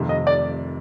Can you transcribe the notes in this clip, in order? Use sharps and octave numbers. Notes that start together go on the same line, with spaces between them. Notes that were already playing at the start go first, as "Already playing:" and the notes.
Already playing: F1 F2 C3 D#3
D#5
D5